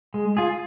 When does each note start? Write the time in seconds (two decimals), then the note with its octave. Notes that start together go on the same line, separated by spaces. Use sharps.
0.14 G#3
0.37 F4 G#4